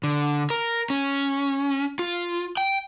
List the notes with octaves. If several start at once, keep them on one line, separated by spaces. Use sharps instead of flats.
D3
A#4
C#4
F4
G5